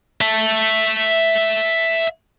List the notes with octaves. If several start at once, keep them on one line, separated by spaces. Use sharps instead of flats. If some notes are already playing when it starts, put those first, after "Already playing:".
E5 A5